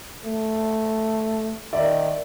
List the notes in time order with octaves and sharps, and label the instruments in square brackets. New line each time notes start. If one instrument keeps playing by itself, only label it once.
[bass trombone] A3
[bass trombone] D#3 [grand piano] D5 E5